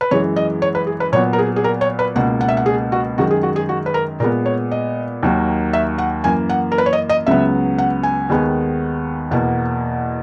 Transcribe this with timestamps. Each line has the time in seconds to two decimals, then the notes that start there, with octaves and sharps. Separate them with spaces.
0.01 B4
0.11 F#2 E3 G#3 C#5
0.36 D#5
0.62 C#5
0.75 B4
0.87 G#4
1.00 B4
1.12 A#2 F#3 B3 C#5
1.33 A#4
1.39 G#4
1.56 G#4
1.64 A#4
1.81 C#5
1.99 B4
2.15 C#2 B2 A#3 F#5
2.41 F#5
2.48 E5
2.57 F#5
2.66 G#4
2.92 F#4
3.18 F#2 D#3 G#3 F#4
3.31 G#4
3.43 F#4
3.56 G#4
3.69 F#4
3.86 B4
3.94 A#4
4.20 A#2 G#3 B3 A#4
4.46 C#5
4.71 D#5
5.23 D#2 D#3 F#3 A#3
5.73 E5
5.98 F#5
6.24 F#2 E3 A#3 G#5
6.50 F#5
6.72 A#4
6.78 B4
6.86 C#5
6.93 D#5
7.09 D#5
7.27 C#2 C#3 F#3 B3 E5
7.78 F#5
8.03 G#5
8.29 D#2 D#3 G#3 B3
9.31 E2 B2 A#3 F#5